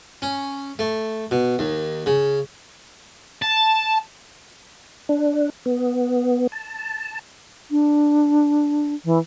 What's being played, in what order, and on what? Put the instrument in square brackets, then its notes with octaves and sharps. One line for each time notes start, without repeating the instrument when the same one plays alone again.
[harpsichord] C#4
A3
B2
D#2
C#3
[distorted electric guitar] A5
[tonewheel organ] D4
B3
A5
[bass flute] D4
E3